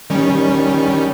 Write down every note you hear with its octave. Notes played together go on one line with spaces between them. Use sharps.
D#3 G3 C#4